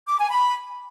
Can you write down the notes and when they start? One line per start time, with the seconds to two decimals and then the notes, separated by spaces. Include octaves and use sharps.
0.09 D6
0.20 G#5
0.31 B5